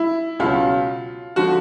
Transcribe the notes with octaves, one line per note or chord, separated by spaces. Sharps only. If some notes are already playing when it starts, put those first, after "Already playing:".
Already playing: E4
C#2 B2 F#3 F4
D3 F3 F#4